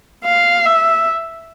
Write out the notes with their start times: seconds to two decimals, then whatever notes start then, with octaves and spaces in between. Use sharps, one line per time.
0.24 F5
0.65 E5